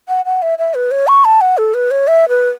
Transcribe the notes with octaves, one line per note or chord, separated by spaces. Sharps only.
F#5
F#5
E5
E5
B4
C#5
C#6
A5
F#5
A4
B4
C#5
E5
B4